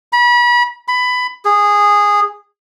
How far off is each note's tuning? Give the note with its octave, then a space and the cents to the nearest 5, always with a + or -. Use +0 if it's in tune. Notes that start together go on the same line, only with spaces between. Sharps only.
B5 -35
B5 +15
G#4 -15